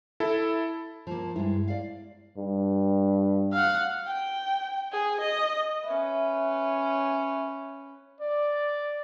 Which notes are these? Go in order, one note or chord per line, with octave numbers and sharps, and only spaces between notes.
E4 A4
F3 A#3
G2 G#3 E4
D5 F5
G2
F5 F#5
G5
G#4
D#5
C#4 B4 E5
D5